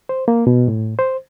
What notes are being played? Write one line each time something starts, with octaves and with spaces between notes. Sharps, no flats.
C5
A#3
B2
A2
C5